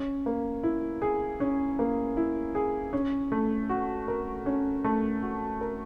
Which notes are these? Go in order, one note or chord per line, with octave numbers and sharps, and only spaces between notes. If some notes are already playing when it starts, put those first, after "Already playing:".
Already playing: C#4
A#3
E4
G#4
C#4
A#3
E4
G#4
C#4
A3
F#4
A#4
C#4
A3
F#4
A#4